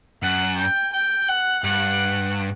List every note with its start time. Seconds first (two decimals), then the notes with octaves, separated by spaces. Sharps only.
0.22 F#2 F#5
0.58 G5
0.93 G5
1.29 F#5
1.64 G2 F#5